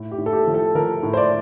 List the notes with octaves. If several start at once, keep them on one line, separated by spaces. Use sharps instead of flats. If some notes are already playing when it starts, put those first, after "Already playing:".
Already playing: A2
G4
A2
A4
G4
F3
A4
F3 A#4
A2
C5
D5